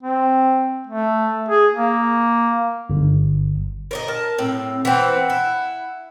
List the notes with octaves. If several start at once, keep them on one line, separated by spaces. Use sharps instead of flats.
C4
A3
G#4
A#3
G1
A#4 D5 D#5
A#4 A5
A2 C4
E3 C4 F#5
E4